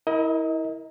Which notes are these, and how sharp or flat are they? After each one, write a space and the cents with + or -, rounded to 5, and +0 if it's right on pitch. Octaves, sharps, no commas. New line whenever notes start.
E4 -25 A#4 +0 D#5 +20